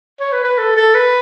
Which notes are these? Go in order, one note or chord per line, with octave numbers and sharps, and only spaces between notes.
C#5
B4
B4
A4
A4
B4